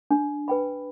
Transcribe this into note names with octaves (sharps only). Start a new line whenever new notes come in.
D4
B4 G5 B5